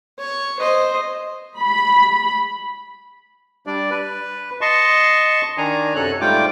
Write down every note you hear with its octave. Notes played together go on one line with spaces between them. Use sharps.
C#5
C5 D#5
B5
G3 D4 D5
B4
D#5 A5 C6 C#6
D#3 D4 G#5 A#5
F#2 C3 F#3 A4 C#5 F#6
G#2 G3 A3 F4 G5 D6